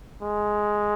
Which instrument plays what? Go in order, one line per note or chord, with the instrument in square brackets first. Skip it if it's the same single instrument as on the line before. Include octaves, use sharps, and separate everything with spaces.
[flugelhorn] G#3